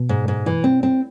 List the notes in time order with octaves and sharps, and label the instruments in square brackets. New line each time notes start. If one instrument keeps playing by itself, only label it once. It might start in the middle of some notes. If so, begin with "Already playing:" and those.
Already playing: [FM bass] B2
[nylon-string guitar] G#2
G#2
E3
C4
C4